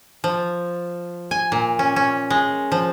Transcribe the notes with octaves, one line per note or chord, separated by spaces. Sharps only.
F3
G#5
A#2
C#4
C#4
G#3
F3